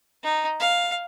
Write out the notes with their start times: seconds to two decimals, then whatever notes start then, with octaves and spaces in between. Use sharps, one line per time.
0.23 D#4
0.60 F5